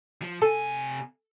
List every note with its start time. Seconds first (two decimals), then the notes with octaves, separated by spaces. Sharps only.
0.22 F3
0.42 C3 A4 G#5